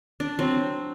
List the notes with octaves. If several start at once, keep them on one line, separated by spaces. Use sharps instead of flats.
D4
F#3 C4